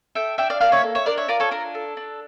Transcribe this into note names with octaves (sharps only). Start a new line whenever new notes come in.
A4 E5 G5
D4 E5 G5
D5 F5
A#3 D5 F5
C#5 E5
A4
C#5 E5
D4 A#4 D5
C#5 E5
F4 A#4 D5
A4 C#5
D4 A#4
A4
D4